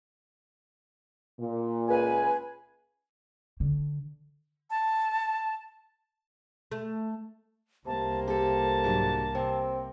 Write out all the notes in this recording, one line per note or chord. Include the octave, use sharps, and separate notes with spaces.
A#2
C#2 B4 G#5
D3
A5
A3
C2 C3 A#3 A5
G4 A4 A5
G#2 D3 F#3
C3 C4